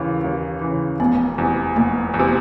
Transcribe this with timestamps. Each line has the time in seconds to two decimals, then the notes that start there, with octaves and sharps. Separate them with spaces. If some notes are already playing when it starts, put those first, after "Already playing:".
Already playing: D#2 C#3 E3
0.24 D#2
0.61 C#3 E3
1.00 F1 B3
1.38 E2 C3
1.76 F1 A#3
2.14 E2
2.19 C3